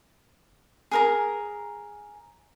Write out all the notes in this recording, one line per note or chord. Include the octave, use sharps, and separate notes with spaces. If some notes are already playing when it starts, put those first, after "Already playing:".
G#4 A#4 A#5